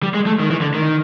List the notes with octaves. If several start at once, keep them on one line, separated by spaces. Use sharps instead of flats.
G3
G#3
A3
D#3
E3
D3
D#3